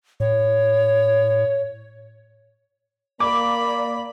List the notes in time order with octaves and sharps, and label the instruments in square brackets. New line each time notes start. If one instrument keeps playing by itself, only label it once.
[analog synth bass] A2 [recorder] C#5
[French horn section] A#3 [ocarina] D5 [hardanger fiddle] B5 [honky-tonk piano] D6